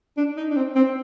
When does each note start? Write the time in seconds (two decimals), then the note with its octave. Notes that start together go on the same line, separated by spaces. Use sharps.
0.17 D4
0.37 D#4
0.51 D4
0.56 C4
0.75 C4